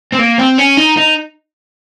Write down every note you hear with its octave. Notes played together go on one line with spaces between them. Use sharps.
C4
A#3
C4
C#4
D#4
D#4